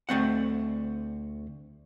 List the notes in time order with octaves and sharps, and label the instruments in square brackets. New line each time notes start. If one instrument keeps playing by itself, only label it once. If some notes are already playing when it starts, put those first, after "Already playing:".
[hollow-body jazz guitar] D2 A3 C4 F#5